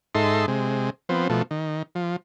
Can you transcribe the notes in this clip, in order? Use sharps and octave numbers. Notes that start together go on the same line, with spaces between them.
G#2 D#4 A4 E5 C6
C3 G#3
F3 B3 C4
B2 F3 A3
D#3
F3